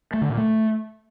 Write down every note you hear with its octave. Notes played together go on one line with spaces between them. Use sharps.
A3
D3
A#2
A3